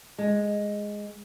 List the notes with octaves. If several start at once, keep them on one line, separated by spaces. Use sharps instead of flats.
G#3